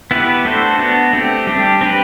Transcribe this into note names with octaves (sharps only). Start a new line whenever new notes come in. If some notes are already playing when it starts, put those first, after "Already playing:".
B3 E4 G4 B4
A3 D4 F#4 A4 C5
B3 D4 F#4
A3 C4 G4
G3 D4 G4
C4 G4 B4